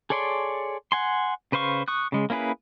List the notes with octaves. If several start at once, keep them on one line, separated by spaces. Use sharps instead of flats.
G#4 A4 C#5 D5 C6
F#5 G#5 C6
C#3 B4 C5 F5 C#6
C#6 D#6 F#6
C#3 G#3
A#3 C#4 E4 G#4 B4